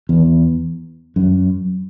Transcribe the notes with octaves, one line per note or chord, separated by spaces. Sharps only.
E2
F#2